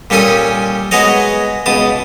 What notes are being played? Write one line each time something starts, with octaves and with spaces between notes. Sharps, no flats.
A#2 G3 C#4 A4 G#5 D#6
G#3 B3 F#4 G#4 C#5 D#5
C#2 B2 A5 D#6